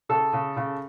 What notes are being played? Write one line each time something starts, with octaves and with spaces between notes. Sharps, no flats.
C#3 A4
C#3
C#3